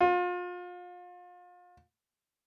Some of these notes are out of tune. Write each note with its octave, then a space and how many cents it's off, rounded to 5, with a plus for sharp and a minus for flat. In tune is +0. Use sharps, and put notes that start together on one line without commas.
F4 +35